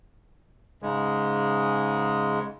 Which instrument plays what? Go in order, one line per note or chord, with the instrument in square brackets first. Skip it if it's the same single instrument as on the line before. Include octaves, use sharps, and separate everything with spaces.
[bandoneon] G#2 C#3 G#3